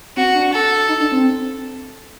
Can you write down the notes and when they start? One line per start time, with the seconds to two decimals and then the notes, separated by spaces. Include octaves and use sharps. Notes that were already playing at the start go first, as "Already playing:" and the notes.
0.17 C4 F#4
0.35 D4
0.52 A4
0.89 D#4
1.00 D4
1.12 C4